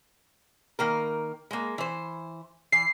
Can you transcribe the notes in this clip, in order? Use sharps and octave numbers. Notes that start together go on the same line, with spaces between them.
D#3 A#3 A#4
G#3 A#3
E3 C5
E3 C7